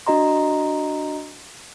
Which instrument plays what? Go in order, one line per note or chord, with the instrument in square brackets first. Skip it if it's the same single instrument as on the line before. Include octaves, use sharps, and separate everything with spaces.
[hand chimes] D4 F#4 D#5 A#5 C6